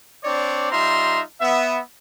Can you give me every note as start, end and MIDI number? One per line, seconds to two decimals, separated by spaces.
0.24 0.72 60
0.24 0.72 62
0.24 0.72 73
0.24 0.72 74
0.72 1.21 55
0.72 1.21 63
0.72 1.21 65
0.72 1.21 76
0.72 1.21 82
0.72 1.21 84
1.41 1.79 59
1.41 1.79 76